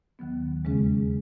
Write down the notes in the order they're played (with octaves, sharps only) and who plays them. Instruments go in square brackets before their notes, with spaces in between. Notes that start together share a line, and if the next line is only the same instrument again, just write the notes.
[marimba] D#2 D#3 F#3 B3
E2 C#3 G#3 C#4 G#4